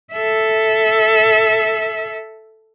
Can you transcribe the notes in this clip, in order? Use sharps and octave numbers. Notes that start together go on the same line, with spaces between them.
A4 E5